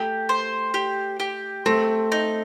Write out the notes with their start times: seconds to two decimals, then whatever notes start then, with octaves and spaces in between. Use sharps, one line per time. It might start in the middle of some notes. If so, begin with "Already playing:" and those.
Already playing: A3 G4
0.29 C5
0.74 G4
1.20 G4
1.66 A3 C4
2.12 D#4